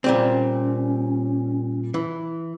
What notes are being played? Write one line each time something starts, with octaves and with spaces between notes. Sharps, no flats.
A#2 G3 C4 C#4
E3